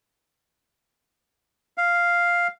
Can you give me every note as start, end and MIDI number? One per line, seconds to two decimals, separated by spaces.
1.77 2.48 77